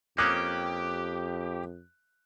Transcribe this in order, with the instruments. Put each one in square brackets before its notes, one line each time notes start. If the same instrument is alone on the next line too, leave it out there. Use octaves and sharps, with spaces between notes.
[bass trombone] F2 [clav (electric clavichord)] A#3 C#4 [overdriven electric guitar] G4 [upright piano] D6 D#6 F#6